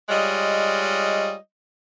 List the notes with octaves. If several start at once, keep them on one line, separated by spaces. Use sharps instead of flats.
G3 G#3 F4 C#5 D#5